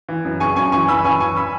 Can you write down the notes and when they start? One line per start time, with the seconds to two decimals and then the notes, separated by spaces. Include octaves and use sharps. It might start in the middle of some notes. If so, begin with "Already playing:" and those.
0.09 E3
0.25 F#2
0.40 C#3 G#5 C#6
0.56 F#2 G#5 C#6
0.72 E3 G#5 C#6
0.88 F#2 B5 E6
1.04 E3 G#5 C#6
1.20 F#2 G#5 C#6
1.37 B5 E6